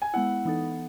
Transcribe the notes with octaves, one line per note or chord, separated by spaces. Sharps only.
G#5
G#3 B3 E4 F#5
E3 B3 D#4 A4